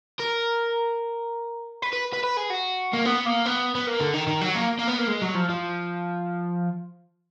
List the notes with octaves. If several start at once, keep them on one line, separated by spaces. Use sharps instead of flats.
A#4
B4
B4
B4
B4
G#4
F#4
A#3
B3
A#3
B3
B3
A#3
D3
D#3
D#3
F#3
A#3
A#3
B3
A#3
G#3
F#3
F3
F3